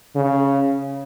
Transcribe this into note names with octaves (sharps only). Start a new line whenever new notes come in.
C#3